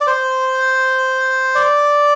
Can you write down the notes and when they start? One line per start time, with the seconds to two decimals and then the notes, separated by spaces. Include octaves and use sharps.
0.01 D5
0.07 C5
1.55 D5